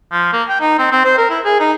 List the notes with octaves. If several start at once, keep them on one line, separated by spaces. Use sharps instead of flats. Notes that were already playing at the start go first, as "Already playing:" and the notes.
F3
A#3
G5
D#4
C4
C4
C5
A#4
E4
G#4
D#4